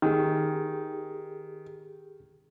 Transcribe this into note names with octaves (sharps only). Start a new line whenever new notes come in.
D#3 G4 G#4